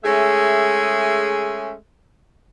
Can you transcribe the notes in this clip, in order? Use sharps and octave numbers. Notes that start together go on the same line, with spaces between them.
G#3 A3 C#4 G#4 E5